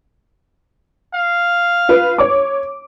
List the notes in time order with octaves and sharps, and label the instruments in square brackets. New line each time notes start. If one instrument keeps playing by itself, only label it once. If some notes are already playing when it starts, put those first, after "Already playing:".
[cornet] F5
[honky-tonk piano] F4 B4
C#5 D6